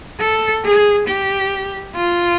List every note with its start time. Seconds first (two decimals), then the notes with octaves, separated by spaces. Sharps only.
0.20 A4
0.65 G#4
1.08 G4
1.96 F4